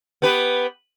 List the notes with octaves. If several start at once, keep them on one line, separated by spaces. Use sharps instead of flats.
B3 G4 B4